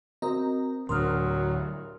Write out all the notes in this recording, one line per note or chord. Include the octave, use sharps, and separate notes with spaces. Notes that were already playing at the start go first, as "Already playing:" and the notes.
C4 F#4 A#4 D#5 A#5
D2 A2 F#3 D4 A#4 C6 D#6 F6